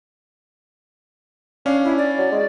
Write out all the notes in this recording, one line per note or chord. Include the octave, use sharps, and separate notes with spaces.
C#4 D4 F5
E4
D5
F#3
G#3